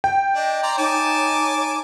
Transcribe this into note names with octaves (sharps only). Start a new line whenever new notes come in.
G5
D4 D#5
D5 A#5 C6
D#4 C#5 G#5 A5 D6